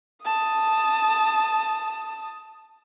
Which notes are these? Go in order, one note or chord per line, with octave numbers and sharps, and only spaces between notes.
A5 D#6